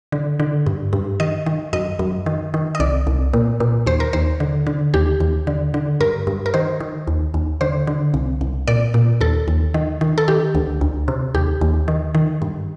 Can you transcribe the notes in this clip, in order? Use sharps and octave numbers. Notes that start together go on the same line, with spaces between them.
D3
D3
G2
G2
D#3 D#5
D#3
F#2 D#5
F#2
D#3
D#3
D#5
C2 D5
C2
A#2
A#2
D#2 C5
A#4
D#2 C5
D3
D3
D#2 G4
D#2
D3
D3
G2 A#4
G2
A#4
D#3 C5
D#3
D#2
D#2
D3 C5
D3
C2
C2
A#2 D5
A#2
D#2 A4
D#2
D#3
D#3
A4
D#3 G4
D2
D2
C3
D#2 G4
D#2
D#3
D#3
G2